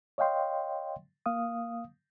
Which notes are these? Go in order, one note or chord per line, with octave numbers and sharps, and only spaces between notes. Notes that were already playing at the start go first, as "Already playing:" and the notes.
C#5 D#5 F5 G5 C6
A#3 F5 D#6